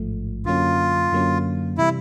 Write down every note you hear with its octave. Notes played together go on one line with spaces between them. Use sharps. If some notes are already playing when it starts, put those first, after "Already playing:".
Already playing: A1 G#2 F3 A3
F#2 D3 F#3 A#3 C#4 F4
F#2 D3 F#3 A#3 C#4
C3 E3 G3 E4